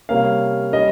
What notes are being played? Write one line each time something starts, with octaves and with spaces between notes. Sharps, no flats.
C3 G3 A#3 C#4 F5
G3 C#4 D#5